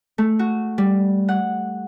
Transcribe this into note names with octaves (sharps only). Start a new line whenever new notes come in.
A3
F#4
G3
F#5